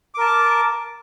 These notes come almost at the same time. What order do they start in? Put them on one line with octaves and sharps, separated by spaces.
D6 A#4 A5